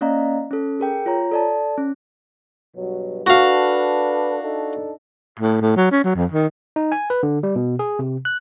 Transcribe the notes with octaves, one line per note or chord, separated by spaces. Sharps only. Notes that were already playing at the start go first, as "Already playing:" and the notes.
A#3 C#4 D5 D#5 F5 A#5
C#4 A4
G#4 A#4 G5
F4 C#5 A#5
A4 D5 A5
C#4
G2 B2 F#3
D4 F#4 A4 B4 F5
D4 D#4 A4
A2
A2
F#3
C#4
F#3
F2
D#3
D#4
G#5
B4
D3
G3
B2
G#4
C3
F#6